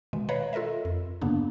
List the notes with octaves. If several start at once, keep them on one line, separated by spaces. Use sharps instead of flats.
B2 D#3 G#3
B4 C#5 D#5 F5 A#5 B5
F4 A4 A#4 D#5 E5
F2
G2 C#3 A#3 B3 D4